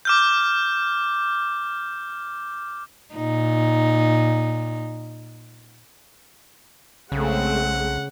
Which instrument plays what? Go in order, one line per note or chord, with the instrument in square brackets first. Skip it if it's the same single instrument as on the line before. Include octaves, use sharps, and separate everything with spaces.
[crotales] D6 F6 G6
[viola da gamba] A#2 D#4
[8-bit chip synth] B1 [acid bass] C#3 [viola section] G#3 A3 C4 [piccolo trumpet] F#5